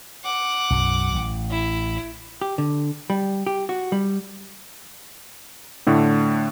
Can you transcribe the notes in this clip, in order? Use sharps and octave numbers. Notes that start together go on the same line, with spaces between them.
F#5 D6
B1 F#2 F#3
A1
E4
G4
D3
G3
G4
F#4
G3
A2 D3 A3